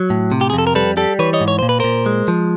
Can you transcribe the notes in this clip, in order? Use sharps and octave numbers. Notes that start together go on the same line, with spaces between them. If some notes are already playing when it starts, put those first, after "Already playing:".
Already playing: F#3
A2
C3
G4
G#4
F2 A4
A#4
G3 A4 B4
G3 G4 A4
E3 B4 C#5
C#5 D#5
G#2
C#5
A#2 C5
B4
A#2 A#4 C5
G#3
F3